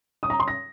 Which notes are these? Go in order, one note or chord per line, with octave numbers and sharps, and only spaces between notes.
D#6
A#5
C6
A#6